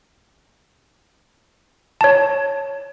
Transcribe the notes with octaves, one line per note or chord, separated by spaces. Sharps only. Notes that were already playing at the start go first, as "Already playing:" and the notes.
C#5 A5